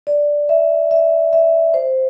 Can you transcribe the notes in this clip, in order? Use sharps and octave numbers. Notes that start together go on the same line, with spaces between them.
D5
E5
E5
E5
C5